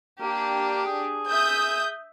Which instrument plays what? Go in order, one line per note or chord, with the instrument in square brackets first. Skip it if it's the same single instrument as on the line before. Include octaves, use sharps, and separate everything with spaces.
[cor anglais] A#3 [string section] D4 G4
[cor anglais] G#4
[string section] E5 D#6 G6